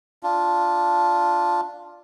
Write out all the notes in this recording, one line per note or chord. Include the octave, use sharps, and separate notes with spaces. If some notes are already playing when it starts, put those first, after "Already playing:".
D4 F4